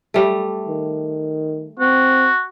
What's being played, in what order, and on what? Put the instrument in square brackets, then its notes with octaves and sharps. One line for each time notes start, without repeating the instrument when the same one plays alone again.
[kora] G3 A3
[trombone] D#3
[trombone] C4 [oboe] F#4